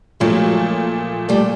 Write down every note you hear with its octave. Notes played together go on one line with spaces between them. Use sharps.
A#2 F3 F#3 G#3 A3
G3 A3